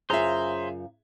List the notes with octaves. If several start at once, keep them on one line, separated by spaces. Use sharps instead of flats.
F#2 C#3 F4 G#4 C5 E5 A#5 F6